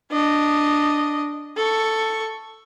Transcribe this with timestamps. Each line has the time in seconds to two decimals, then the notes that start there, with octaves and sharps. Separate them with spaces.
0.11 D4 D#5
1.57 A4 C#6